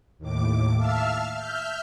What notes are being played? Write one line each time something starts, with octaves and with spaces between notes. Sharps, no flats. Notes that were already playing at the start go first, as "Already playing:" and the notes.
D#2 A2 D6
E5 F5 A5 E6 F6
E5 F6 G6